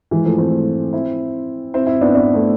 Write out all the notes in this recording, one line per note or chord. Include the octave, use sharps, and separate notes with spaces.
E3 G#3
F3 A3
A3 C4
C4 E4
C4 E4
C4 E4
B3 D4
B3 D4
A3 C4